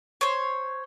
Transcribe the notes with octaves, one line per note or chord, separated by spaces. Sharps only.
C5 C#5